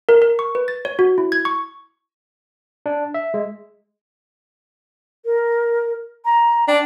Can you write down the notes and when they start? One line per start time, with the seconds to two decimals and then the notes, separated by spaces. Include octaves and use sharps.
0.09 A#4
0.22 A#4
0.39 C#6
0.55 B4
0.68 A6
0.85 C#5
0.99 F#4
1.18 E4
1.32 G#6
1.45 C#6
2.86 D4
3.14 E5
3.34 G#3
5.25 A#4
6.25 A#5
6.68 D4 G5